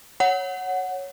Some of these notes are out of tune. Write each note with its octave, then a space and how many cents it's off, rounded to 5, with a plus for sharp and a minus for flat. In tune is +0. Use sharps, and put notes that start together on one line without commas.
C#5 +0 F#5 +0